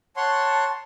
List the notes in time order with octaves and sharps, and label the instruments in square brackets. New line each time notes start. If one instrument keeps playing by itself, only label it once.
[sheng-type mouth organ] C#5 F#5 C6 [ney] A5